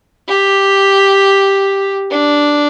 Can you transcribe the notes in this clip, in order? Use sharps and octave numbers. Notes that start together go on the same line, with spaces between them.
G4
D4